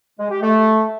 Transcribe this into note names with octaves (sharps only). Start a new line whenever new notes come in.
G#3
G4
A3